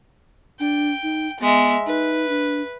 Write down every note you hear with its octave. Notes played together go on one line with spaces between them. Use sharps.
D4 G5
D#4
G#3 B3 E5
D#4 B4
D4